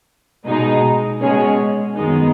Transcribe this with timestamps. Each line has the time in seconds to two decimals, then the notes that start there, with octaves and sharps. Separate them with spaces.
0.46 B2 G#3 D#4
1.21 B2 G#3 C#4 G#4 C#5
1.95 F#2 D#3 G#3 B3 D#4